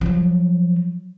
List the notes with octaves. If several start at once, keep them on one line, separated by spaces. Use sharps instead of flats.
F3 F#3